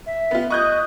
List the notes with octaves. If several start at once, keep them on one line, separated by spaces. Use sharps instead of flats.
E5
B3 F4
D#5 C#6 D#6 F#6 G6